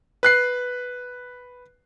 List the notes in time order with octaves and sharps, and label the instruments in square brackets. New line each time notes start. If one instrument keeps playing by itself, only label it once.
[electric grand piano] B4 F#6 C7